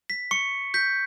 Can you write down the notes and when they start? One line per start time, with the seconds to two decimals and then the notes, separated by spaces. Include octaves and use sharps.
0.10 B6
0.31 C#6 C#7
0.74 G6 B6